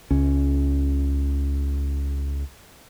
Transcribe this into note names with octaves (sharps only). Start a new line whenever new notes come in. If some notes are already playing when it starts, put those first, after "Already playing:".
C#2 C#4